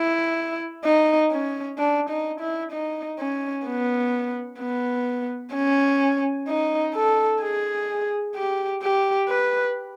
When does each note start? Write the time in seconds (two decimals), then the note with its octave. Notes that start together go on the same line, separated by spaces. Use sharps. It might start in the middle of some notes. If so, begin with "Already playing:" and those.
Already playing: E4
0.85 D#4
1.32 C#4
1.78 D4
2.10 D#4
2.41 E4
2.72 D#4
3.19 C#4
3.66 B3
4.60 B3
5.54 C#4
6.48 D#4
6.95 A4
7.42 G#4
8.36 G4
8.82 G4
9.29 B4